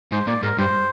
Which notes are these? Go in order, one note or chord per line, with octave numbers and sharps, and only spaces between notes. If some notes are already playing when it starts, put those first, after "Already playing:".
G#2 C5
A#2 D5
G#2 A#4
G2 C5